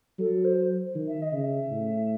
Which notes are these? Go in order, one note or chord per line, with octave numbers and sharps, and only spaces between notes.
F#3 A4
C5
D#3
E5
D#5
C#3 E5
A2